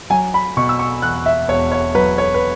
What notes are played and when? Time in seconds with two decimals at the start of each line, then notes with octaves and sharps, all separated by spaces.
0.10 F#3 G#5
0.34 B5
0.57 B2 C#6
0.69 E6
0.79 C#6
1.02 E2 F#6
1.26 E5
1.48 E1 C#5
1.72 C#5
1.95 F#3 B4
2.18 C#5
2.34 B4